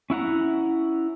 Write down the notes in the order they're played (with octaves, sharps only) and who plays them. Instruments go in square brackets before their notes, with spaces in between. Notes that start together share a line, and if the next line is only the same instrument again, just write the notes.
[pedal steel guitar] C#4 E4 F#5 A#5